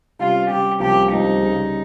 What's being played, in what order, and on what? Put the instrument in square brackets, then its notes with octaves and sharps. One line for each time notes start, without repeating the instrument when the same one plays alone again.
[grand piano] C3 G3 C#4 [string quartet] F4
[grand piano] C3 G3 C#4 [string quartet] G4
[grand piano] C2 C3 F3 A#3 C#4 [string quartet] G4
[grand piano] C2 C3 F3 A#3 C#4 [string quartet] D#4
[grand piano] C#3 G3 C#4 G#4